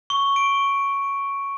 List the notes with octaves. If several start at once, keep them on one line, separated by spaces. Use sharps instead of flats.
C#6
D7